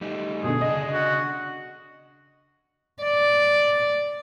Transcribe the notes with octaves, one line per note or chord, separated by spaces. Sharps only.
G3 A3 D#4
B2 D3 G#4
C#3 D4 D#5
F#4
D5